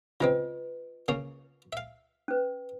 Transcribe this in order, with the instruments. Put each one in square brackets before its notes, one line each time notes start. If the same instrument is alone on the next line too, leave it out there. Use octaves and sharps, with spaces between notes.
[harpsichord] C#3 G#3 C4 [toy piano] F4 B4 D#5
[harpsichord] C#3 A#3 C#4
E5 F5
[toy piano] C#4 B4